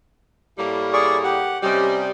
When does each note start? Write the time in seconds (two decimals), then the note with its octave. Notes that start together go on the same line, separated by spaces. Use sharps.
0.58 A2 G3 A#3
0.93 G#4 D5 C#6
1.24 G4 F#5
1.63 C3 G3 C#4 D#5